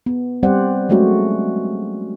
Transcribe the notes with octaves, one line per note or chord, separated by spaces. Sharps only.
B3
G3 C4 G4 C5 D5 F#5
F#3 G#3 A3 C#4 F#4